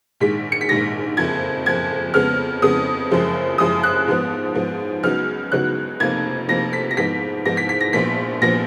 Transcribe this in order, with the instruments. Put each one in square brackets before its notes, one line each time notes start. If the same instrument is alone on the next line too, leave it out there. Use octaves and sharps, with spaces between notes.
[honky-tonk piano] A#1 G#2 D#3 G#3 B6
C#7
B6
A#1 G#2 D#3 G#3 A#6
F#1 F2 F3 G#6
F#1 F2 F3 G#6
F2 C#3 G#3 B3 F6
F2 C#3 G#3 B3 D#6
F#1 F#2 F3 G#3
F#1 F#2 F3 G#3 D#6
F#6
G#2 F3 B3
G#2 F3 B3
C#2 C#3 F#3 B3 D#4 F6
C#2 C#3 F#3 B3 D#4 F#6
F1 F2 F3 A#3 D#4 G#6
F1 F2 F3 A#3 D#4 A#6
B6
A#6
G#2 F3 B3 D#4 B6
G#2 F3 B3 D#4 A#6
B6
B6
A#6
A#1 A#2 F3 B3 B6
A#1 A#2 F3 B3 A#6